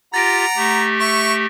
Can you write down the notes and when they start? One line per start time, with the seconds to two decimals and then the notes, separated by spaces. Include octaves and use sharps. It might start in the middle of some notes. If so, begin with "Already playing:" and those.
0.14 F4 G4 F#5 A#5 A6 A#6 D7
0.56 A3 G4
1.00 E5 C#6